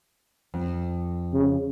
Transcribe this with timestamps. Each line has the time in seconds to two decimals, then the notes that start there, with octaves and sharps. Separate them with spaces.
0.54 F2
1.34 C#3